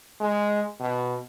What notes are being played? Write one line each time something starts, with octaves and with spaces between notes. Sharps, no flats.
G#3
B2